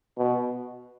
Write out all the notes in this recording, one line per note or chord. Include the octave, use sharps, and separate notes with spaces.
B2